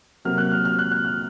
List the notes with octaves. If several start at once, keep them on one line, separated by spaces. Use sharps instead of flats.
C3 F#3 A#3 F6
F#6
F6
F6
F#6
F#6
F6